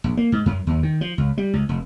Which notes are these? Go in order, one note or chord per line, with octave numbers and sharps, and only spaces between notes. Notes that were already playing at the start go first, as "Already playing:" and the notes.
A#1
A#3
G#2
F#2
D#2
D#3
F3
C#2
G3
C#2
F1